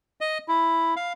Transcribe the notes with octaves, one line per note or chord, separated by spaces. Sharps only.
D#5
E4
F5